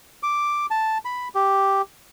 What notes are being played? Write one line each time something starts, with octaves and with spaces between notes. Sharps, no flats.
D6
A5
B5
G4